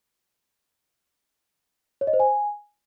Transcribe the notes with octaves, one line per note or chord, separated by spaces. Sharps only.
C#5
D#5
C5
G#5